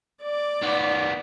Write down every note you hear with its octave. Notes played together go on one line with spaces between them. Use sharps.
D5 D6
D#3 B3